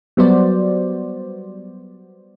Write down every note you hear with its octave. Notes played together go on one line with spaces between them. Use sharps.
F#3 G3 B3 F#4 C5 D5